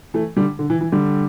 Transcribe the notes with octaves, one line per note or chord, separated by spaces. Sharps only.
E3 A3
D3 G3
D3
E3
E3
D3 G3